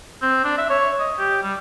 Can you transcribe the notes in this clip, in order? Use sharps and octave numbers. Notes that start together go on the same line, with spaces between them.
C4
D4
E5
C#5
D#5
G4
G3